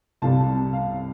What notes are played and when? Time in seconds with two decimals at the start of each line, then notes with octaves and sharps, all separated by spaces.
0.22 C2 C3 G3 F5 A5
0.73 F5